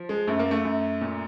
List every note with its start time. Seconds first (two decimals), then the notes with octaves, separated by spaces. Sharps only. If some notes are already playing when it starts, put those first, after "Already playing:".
Already playing: F3
0.09 G#3
0.28 F#2 A3
0.39 A#3
0.51 A3
0.65 F#2
1.01 A#2